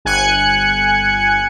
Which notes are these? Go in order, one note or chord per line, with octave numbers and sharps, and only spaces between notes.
G1 G#5 F#6 G#6 C#7